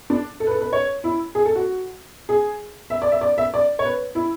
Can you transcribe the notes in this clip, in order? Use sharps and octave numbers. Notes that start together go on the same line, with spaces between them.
D4
A4
B4
A4
B4
C#5
E4
G#4
A4
F#4
G#4
E5
D5
E5
D5
E5
D5
C#5
B4
E4